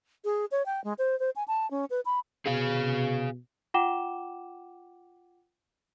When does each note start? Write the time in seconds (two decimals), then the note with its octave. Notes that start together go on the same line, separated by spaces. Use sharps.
0.25 G#4
0.52 C#5
0.66 G5
0.84 G#3
0.99 C5
1.20 C5
1.36 G#5
1.48 A5
1.71 C#4
1.90 B4
2.05 B5
2.46 B2 G#4 F5
3.74 F4 F#5 G5 D6 E7 G7